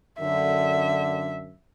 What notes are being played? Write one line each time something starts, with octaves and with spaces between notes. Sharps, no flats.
F#2 D3 E5